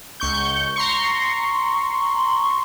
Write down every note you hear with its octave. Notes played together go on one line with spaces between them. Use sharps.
C#2 C#6 G6
A#5 C6 C#6